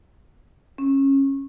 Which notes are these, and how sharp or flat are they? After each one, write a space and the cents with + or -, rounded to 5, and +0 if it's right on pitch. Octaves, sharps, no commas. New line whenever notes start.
C#4 -20